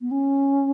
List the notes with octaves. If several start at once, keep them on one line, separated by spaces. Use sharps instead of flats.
B3
C#4